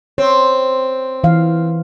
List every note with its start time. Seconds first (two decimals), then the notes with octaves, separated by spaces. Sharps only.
0.18 C4 C#5
1.24 E3 F5